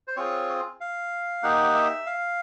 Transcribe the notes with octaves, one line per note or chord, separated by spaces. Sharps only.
C5
C4 F4 G#4 C#5
F5
A#3 D#4 G4 F#5
E5
F5